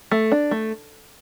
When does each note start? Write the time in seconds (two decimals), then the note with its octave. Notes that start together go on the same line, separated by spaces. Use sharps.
0.11 A3
0.32 D4
0.51 A3